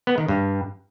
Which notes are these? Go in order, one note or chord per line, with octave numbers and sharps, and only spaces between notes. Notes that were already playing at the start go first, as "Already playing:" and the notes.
B3
D#3
G2